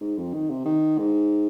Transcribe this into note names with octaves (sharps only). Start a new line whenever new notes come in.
G#2
F2
D#3
C3
D#3
G#2